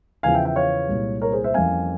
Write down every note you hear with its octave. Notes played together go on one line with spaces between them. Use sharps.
E2 C#3 F3 F5 G#5
E5 G5
E5 G5
C#5 F5
C2 A#2 G#3
A#4 C#5
G#4 C5
C5 E5
F2 E3 G3 A#3 C#4 F5 G#5